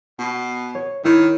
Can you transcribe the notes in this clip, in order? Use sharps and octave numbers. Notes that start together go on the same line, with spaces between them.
B2
C#5
D#3 E4 C#5 B5